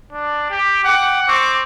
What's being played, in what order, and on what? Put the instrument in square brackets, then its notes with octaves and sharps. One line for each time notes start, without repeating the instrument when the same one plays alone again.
[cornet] D4
G4
[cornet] F#5 [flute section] G5 D6
[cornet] C4 [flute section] C#6 D6